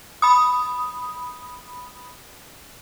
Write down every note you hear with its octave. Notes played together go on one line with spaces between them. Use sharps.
B5 D#6